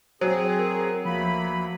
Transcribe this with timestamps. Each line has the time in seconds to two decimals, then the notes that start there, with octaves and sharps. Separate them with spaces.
0.21 F#3 C4 G#4 C5
0.59 A#4
1.05 D2 F3 A#3 B5